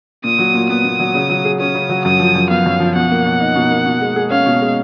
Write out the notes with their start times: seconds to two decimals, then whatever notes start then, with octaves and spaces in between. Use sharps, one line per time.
0.24 A#2 D#6
0.39 F#3
0.54 A#2
0.69 B3 D#6
0.84 A#2
0.99 F#3
1.14 C#3
1.30 F#3
1.45 G#4
1.60 C#4 D#6
1.75 C#3
1.90 F#3
2.05 F#2 D#6
2.20 F3
2.35 F#2
2.50 B3 F5
2.66 F#2
2.80 F3
2.95 B2 F#5
3.11 A#3
3.25 B2
3.40 D#4
3.56 B2
3.70 A#3
3.86 B2
4.01 G#3
4.16 G#4
4.30 C#4 F5
4.46 B2
4.61 G#3